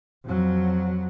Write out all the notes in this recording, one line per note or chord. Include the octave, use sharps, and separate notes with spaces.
F2 F#3